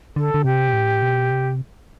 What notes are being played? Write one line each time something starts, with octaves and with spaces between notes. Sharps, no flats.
D3 A4
D3
C3 G4
B2
A2
B2
C3